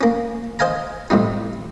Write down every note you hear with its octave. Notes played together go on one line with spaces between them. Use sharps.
A#3 C#4
C5 D#5 F5 G#5 A#5
A2 C3 G3 D#4